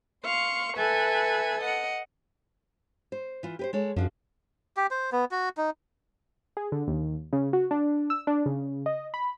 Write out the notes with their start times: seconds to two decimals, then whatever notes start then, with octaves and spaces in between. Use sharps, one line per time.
0.24 F5 C6 C#6
0.77 A4 B4 E5 G#5
1.61 D#5 F#5
3.12 C5
3.43 E3 F4
3.59 G4 B4 C5
3.73 G#3 A4 C#5
3.96 F#2 F3 D4 F#4
4.77 G4
4.91 C5
5.12 B3
5.31 F#4
5.57 D#4
6.57 G#4
6.72 D3
6.87 D#2
7.33 C#3
7.53 F#4
7.71 D4
8.10 E6
8.27 D4
8.46 C#3
8.86 D#5
9.14 B5